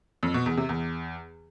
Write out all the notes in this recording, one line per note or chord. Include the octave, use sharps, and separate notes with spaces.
F2
B2
E2
C3
E2